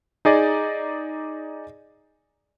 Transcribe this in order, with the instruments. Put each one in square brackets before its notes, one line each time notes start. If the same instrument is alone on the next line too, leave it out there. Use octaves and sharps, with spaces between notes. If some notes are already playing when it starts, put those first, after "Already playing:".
[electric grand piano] D#4 G#4 D5 D#5